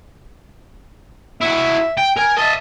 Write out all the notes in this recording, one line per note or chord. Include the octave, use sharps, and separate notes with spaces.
E4 F#4 E5
G5
A#4 G#5
D#5 E5 A5